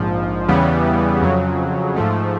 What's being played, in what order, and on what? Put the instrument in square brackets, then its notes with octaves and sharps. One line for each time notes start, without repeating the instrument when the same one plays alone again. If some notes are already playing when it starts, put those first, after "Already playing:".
Already playing: [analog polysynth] A#1 G#2 F3
E2 C#3 E3 G3 B3
F2 C#3 F#3
G#2 F3 A3